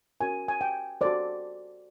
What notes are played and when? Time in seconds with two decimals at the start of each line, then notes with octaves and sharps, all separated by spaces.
0.21 C#4 F#4 A#4 C#5 G#5
0.48 G#5
0.61 G5
1.01 F#4 A4 C5 D5